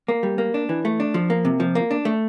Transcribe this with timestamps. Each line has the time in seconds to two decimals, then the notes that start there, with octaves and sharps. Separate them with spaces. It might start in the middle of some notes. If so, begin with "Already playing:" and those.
0.08 A#3
0.23 G3
0.38 A#3
0.54 D4
0.69 E3
0.85 A3
1.00 D4
1.14 F3
1.30 A#3
1.45 C3
1.60 F3
1.75 A#3
1.91 D4
2.05 A3